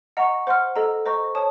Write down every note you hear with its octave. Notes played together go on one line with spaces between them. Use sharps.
D#5 F#5 A#5 C#6
C5 F#5 C6 F6
A4 D#5 A#5
C5 D#5 A#5 C#6
C#5 A5 D#6